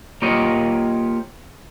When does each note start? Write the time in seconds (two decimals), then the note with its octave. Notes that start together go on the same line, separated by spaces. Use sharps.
0.22 A#3 F4 G4 C#5 D#5